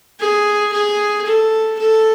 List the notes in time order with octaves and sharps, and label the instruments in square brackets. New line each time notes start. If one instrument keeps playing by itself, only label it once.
[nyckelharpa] G#4
G#4
A4
A4